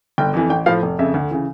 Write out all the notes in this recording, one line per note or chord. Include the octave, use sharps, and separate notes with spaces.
G1 G5
F2 E3
A1 G5
A2 F3 F5
F1
F2 C#3 E5
D2
C#3 E3